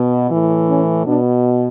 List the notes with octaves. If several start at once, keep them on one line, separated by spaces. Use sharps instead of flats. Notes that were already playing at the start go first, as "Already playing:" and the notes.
Already playing: B2
A2 E3
C#4
B2 D4